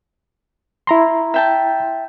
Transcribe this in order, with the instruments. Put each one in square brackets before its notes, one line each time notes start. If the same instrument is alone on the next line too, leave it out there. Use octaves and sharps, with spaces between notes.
[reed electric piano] E4 A#5 C6
[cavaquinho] E5 G5 A5